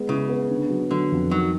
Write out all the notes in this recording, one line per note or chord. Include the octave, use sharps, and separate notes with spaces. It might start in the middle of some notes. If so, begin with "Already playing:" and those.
Already playing: G#3 B3
C#3 E4
B3
D3
F#3
D3 F#3
F2
D#3 F#3